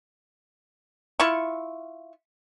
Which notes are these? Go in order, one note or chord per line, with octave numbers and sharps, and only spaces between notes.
E4 F4 C#6